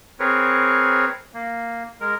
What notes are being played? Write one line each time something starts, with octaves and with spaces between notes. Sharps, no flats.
C4 G#4 A#4 B4 C#5
A#3
G#3 A#4